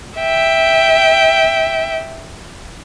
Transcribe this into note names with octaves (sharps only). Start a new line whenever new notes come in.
E5 G5